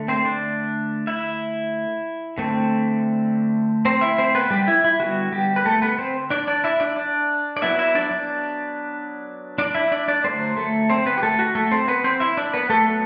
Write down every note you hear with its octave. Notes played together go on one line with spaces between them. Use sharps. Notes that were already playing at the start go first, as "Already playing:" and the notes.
Already playing: D3 A3
C4 C5
D4 D5
E4 E5
D3 A3 C4
C4 C5
E4 E5
C4 C5
B3 B4
G3 G4
E4
E4
D3 G3 B3 F#4
G3 G4
B4
A3 A4
B3 B4
C4 C5
D4 D5
D4 D5
E4 E5
D4 D5
D4 D5
D5
F#3 B3 E4 E5
E4 E5
D4 D5
D4 D5
D4 D5
E4 E5
D4 D5
D4 D5
D3 F#3 A3 C4 C5
A3 A4
C4 C5
B3 B4
G4
A3 A4
F#4
A3 A4
C4 C5
B3 B4
C4 C5
E4 E5
D4 D5
B3 B4
A3 A4
F#3 B3